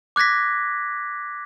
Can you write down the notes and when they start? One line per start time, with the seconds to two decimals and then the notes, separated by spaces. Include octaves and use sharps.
0.16 D6 F#6 G#6 A#6 B6